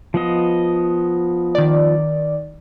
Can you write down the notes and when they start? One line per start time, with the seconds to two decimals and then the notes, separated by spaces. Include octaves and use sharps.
0.14 F3 B3 D#5
1.55 D#3 D5